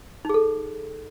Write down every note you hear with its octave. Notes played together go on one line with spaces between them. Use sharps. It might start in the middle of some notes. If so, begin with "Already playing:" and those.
D#4 G#4 A4